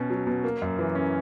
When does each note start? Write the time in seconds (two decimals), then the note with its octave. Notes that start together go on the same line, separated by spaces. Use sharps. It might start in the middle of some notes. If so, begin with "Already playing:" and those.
Already playing: B2 C#4
0.10 F#3
0.27 B2
0.44 A#3
0.62 F#2
0.79 E3
0.95 C#4